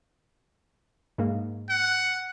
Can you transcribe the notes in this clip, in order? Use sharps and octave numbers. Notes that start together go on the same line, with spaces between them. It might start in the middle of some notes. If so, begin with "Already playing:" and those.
G#2 A#3
F#5